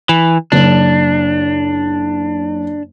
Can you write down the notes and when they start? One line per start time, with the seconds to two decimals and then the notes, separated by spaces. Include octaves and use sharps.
0.09 E3
0.52 F#1 D4